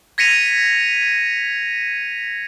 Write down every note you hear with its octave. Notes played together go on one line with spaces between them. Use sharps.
G#6 A#6 B6 C#7 D#7 F7